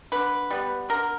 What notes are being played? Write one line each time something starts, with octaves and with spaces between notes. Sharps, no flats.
D3 B4
G3 B3
D3 A#4